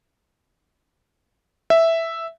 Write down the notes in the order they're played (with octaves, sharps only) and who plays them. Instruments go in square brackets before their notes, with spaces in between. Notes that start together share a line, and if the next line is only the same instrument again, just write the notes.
[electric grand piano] E5